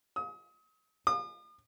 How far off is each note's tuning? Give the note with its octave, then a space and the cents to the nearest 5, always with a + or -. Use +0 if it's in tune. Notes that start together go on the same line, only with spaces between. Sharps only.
D#6 +35
D#6 -45